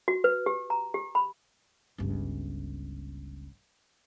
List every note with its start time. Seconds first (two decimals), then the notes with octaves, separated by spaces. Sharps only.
0.08 F#4
0.24 B4
0.46 G4
0.70 A#5
0.94 G4
1.15 B5
1.98 G1 C#2